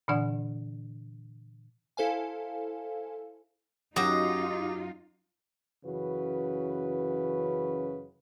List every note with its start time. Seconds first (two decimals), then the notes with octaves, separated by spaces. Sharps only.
0.08 A#2 D3 E3 D4 D5 F#5
1.97 E4 A4 C5 F5 G#5
3.96 F#2 F#3 D#4 F4 G4 D#5
5.86 F#2 C#3 E3 F#4 B4